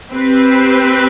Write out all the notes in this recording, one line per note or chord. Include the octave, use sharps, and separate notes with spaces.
C4 G4 B4